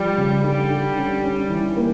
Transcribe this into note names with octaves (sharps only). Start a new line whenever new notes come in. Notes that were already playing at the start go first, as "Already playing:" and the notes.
Already playing: F3 G3
C#3
D3 G3
D3
C#4
C#4
E3
A#3